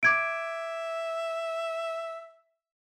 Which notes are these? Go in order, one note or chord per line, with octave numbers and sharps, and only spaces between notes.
E5 D6 G#6 D7